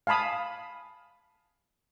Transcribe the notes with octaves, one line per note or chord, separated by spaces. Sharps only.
F5 G#5 A5 B5 D#6